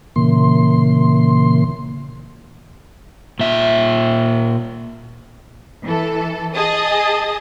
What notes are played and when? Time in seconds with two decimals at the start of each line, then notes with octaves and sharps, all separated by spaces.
0.16 A#2 C#3 E3 A#3 C6
3.39 A#2 E5
5.84 E3 A4
6.54 G#4 D#5 A5 D#6